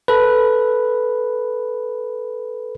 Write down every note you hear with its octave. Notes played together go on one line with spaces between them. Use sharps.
A4 B4